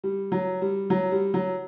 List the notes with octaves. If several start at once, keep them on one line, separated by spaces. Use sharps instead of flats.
G3
F#3
G3
F#3
G3
F#3